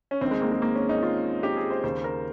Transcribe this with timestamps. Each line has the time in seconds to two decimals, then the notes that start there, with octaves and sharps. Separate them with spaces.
0.11 C#4
0.21 D#2 D#3 C4
0.31 G#3
0.42 A#3
0.52 G#3
0.62 A#3
0.75 C#4
0.89 D#4
1.03 F4
1.43 G4
1.57 G#4
1.70 C5
1.83 D#2 C#3 C5
2.04 A#4